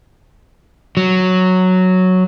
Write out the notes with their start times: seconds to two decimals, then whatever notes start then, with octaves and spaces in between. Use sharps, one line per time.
0.97 F#3